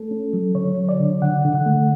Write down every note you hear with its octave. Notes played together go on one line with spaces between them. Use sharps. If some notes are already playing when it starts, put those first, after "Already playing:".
Already playing: A3 A4
C#4
F#3
D3 C#5
F#3
D5
D3
D3 F#5
D3
F#5
A3